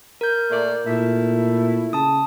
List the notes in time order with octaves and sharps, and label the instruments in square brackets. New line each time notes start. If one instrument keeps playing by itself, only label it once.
[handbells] A#4 G6
[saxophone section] A#2 A3 D5
[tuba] A#2 [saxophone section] A3 E4
[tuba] C#3 [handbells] A5 D#6